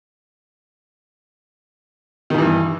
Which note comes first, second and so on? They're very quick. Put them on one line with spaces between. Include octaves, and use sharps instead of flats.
D#3 B2 E3 G2